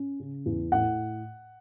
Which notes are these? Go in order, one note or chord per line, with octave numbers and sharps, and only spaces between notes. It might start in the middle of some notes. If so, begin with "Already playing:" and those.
Already playing: C#4
C#3
E2
A2 F#5